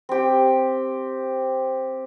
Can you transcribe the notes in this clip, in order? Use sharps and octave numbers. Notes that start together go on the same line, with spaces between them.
C4 G4